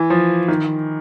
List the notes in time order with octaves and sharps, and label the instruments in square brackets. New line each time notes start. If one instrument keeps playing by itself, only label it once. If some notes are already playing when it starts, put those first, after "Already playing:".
Already playing: [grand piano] E3
F3
D#3